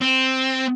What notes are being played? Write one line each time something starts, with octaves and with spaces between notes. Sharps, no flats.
C4